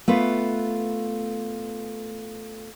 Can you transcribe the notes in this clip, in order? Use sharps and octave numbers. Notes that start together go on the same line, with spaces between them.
A3 B3 F4 B4